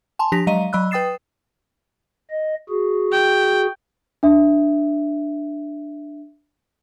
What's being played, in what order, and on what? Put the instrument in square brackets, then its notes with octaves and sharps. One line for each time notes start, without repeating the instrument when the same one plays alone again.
[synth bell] G#5 A5 C6
F3 D4 G4 A#6 B6 F7
F#3 G#3 D#5 F5 A#5 D#7
F#3 D#5 B5 E6 F#6
B4 G5 D#6 A6 C7 E7
[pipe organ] D#5
F#4 G#4
[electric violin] G5
[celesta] D4 E5